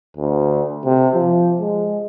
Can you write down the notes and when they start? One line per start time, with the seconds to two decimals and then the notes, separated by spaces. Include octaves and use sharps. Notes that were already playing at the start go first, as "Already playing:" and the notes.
0.17 D2
0.85 C3
1.15 F3
1.61 G#3